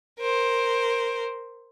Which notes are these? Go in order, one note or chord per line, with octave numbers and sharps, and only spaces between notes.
A#4 C5